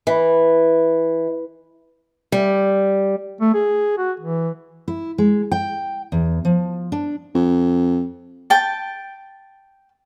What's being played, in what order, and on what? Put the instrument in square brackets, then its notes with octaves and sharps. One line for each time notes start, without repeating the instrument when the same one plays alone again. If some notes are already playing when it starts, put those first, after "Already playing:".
[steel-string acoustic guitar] E3
G3
[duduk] A3
G#4
F#4
E3
[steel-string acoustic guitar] E4
G#3
G5
E2
F3
D4
[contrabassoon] F2
[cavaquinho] G5 A5